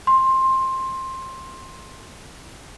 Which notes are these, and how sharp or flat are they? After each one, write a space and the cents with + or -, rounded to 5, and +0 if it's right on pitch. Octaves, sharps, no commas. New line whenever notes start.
C6 +15